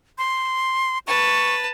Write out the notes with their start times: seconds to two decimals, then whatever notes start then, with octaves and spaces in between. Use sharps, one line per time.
0.18 C6
1.07 B4 A5 C#6